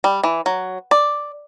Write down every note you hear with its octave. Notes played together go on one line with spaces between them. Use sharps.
G3
E3
F#3
D5